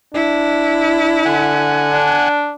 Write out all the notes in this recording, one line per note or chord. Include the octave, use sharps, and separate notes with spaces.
D4 E4
D3 F#5 G#5
D4